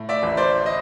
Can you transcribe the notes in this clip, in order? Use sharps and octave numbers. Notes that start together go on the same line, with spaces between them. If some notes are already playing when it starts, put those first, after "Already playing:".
Already playing: A2
D5 E5
A1
C5 D5
D#5